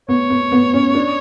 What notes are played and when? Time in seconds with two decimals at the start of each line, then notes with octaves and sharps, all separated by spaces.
0.09 B3 C#5
0.30 B3
0.52 B3
0.74 C#4
0.95 D4